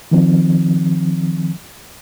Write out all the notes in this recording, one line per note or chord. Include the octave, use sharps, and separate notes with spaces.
D#3 F3 C4